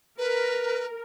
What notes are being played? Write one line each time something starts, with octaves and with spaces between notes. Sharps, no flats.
A#4 B4